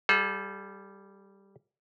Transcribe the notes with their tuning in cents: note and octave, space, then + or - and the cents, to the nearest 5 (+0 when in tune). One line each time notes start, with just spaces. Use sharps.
G3 +0 A4 -40 F5 +15